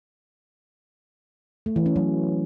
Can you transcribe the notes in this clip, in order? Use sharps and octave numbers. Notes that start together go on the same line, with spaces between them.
A3
E3
C#4
F#3